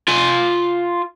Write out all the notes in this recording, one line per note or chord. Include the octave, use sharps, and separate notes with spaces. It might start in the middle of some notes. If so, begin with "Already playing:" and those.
F4 G#5